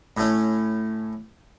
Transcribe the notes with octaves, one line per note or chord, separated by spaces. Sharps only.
A2 A3 C#4